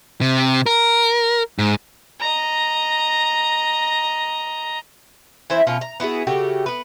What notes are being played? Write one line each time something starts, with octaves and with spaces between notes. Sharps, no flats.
C3
A#4
G#2
D#5 A#5
E3 E4 C5 E5
B2 C#4 F4
A#5
B3 E4 F#4 G#4
C#3 A3 F#4 G4
B3 B4